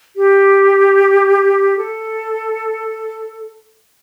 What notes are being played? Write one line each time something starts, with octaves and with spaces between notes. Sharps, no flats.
G4
A4